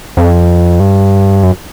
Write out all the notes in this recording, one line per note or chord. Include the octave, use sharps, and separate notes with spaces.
F2
G2
F#2